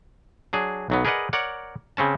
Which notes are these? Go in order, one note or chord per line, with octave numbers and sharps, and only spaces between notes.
F#3 D4 G#4
B1 F#3 B3
G#4 A#4 B4 D5 D#5 F#5
A#4 C#5 D5 F#5
C#3 C4 C#4 A5